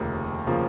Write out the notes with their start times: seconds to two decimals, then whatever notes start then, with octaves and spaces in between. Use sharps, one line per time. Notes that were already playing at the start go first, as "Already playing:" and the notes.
Already playing: F1 D#2 C#3 F3 A#3
0.47 C#3 F3 A#3